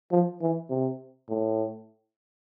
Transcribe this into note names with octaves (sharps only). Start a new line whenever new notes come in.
F3
E3
C3
A2